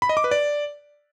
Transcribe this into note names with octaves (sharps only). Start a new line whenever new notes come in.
B5
D#5
D6
B4
D5